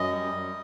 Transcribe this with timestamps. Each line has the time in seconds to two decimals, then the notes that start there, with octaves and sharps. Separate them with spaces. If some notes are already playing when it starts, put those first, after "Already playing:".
Already playing: F#2 D#5
0.10 G3
0.33 F#2